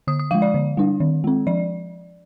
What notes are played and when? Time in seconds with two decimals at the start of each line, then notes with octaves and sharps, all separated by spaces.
0.07 D3 D#6
0.19 D#6
0.31 F3 G#3 F5
0.42 D5
0.54 D3
0.77 G3 D4
1.00 D#3
1.24 G#3 C4
1.47 F3 D5